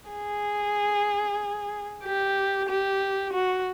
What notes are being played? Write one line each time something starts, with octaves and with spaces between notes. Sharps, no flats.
G#4
G4
G4
F#4